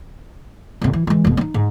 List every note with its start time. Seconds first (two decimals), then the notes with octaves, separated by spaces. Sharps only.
0.81 G#1 C3
0.93 E3
1.07 E3 G#3
1.25 F1 B2
1.37 C4 D#4
1.54 G#2